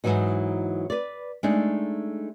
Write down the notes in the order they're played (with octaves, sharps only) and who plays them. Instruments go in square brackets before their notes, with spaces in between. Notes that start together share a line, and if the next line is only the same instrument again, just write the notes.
[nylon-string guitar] G#2 B2 E3 F#3 D#4
B4 D5
G#3 A3 D4 D#4